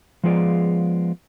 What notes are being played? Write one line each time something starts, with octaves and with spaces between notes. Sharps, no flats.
F3 G#3 B3 F4 G#4 D5